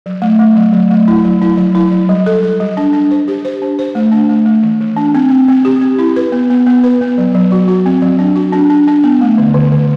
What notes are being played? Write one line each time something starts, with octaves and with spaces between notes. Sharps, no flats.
F#3
A3
A3
F#3
F#3
A3
E4
F#3
E4
F#3
E4
F#3
G3
A4
A4
G3
D4
D4
C5
G4
C5
D4
C5
A3
D4
A3
A3
E3
E3
D4
C4
C4
C4
G4
C4
E4
B4
B3
B3
B3
B4
B3
F#3
F#3
F#4
F#4
C4
F#3
D4
F#4
D4
D4
D4
B3
A3
D3
D3
D3